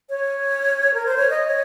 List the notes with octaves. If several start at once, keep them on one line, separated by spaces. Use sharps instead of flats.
C#5
A#4
C5
C#5
D#5
C#5